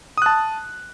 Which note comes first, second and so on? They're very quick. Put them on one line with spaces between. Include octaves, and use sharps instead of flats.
D#6 F#6 A5